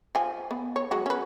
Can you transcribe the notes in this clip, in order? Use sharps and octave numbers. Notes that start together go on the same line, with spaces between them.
F3 G#5
B3
C#5
F#3 G#3 F#4
C#4 B4